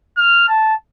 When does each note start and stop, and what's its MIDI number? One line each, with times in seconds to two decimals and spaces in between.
0.17 0.47 89
0.48 0.74 81